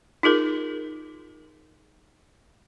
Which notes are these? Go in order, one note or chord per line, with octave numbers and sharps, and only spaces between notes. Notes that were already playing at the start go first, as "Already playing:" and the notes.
D#4 F4 G#4 A#4